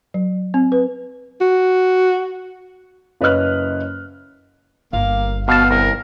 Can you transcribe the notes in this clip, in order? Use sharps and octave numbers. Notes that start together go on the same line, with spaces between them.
F#3
C4
B4
F#4
F#1 B4 C#5 D#5 F6 F#6
G1 A#3 F5
B2 B3 F5 A5
C2 A#4